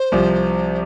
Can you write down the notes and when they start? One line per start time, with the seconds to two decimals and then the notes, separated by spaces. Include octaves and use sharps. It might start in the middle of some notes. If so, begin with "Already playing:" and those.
Already playing: C5
0.12 C2 C3 F3